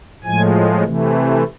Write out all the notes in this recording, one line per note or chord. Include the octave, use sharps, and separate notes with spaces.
A2 F3 G#3 G#5
C3 E3 A3